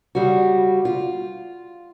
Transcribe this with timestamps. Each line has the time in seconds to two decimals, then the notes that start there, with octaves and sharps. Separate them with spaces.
0.15 C#3 G3 F#4
0.85 F4